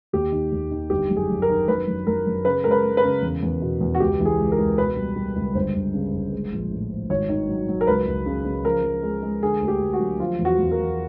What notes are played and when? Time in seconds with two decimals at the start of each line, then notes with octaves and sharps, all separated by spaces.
0.13 D#2 G4
0.32 D#3
0.52 D#2
0.71 D#3
0.90 G1 G4
1.10 F#2
1.17 G#4
1.29 F#2
1.42 A#4
1.49 D#3
1.68 F#2 B4
1.88 F#2
2.07 F#2 A#4
2.27 F#2
2.45 C#3 B4
2.64 G#3 A#4
2.71 B4
2.84 G#3
2.97 B4
3.04 C#3
3.22 E2
3.43 E2
3.62 B2
3.81 E2
3.95 F#4
4.00 C#2 G4
4.20 E3
4.25 G#4
4.39 C#2
4.52 A#4
4.58 C#2
4.77 B2 B4
4.96 G3
5.16 G3
5.36 C#2
5.55 G1 C5
5.74 G1
5.94 C#3
6.13 G1
6.32 G#3
6.52 A#1
6.71 A2
6.90 F3
7.10 G#1 C#5
7.29 D#3
7.49 F#3
7.68 F#3
7.81 A#4
7.87 C#2 B4
8.07 C#2
8.26 C#3
8.45 C#3
8.65 F3 A#4
8.84 F3
9.03 G#3
9.23 G#3
9.42 D3 G#4
9.61 D2
9.68 G4
9.81 D2
9.93 F#4
10.00 F#3
10.20 F3 F4
10.39 E2
10.45 F#4
10.59 E2
10.71 A#4
10.78 E2